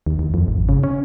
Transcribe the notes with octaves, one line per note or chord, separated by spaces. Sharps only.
D#2
D#2
F2
G#1
C#3
C#4